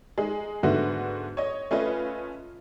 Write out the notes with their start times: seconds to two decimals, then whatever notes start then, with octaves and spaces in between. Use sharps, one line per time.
0.18 G#3 D#4 G#4
0.63 G#2 D3 A3 B3 F#4
1.37 C#5 D#5
1.71 A3 C#4 F4 B4 D#5